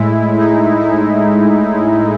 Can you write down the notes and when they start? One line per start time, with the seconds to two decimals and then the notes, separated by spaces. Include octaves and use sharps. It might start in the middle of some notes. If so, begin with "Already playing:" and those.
Already playing: A2 G#3 E4
0.38 D#4
0.80 E4